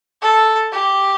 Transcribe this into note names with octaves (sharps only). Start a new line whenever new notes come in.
A4
G4